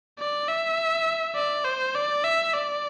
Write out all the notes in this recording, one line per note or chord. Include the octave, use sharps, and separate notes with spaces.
D5
E5
D5
C5
D5
E5
D5